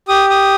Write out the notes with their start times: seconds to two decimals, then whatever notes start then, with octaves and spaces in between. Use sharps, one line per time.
0.08 G4 D#6
0.30 D#6